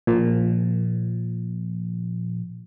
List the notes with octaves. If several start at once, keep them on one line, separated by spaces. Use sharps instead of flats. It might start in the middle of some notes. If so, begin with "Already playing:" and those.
A#2 F3